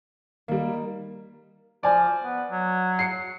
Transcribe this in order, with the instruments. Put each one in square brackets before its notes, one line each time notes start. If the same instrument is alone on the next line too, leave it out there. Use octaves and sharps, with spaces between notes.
[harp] D#3 [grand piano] G3 A#3
[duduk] F3 [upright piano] D5 G#5
[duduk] B3
F#3
[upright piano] C7 C#7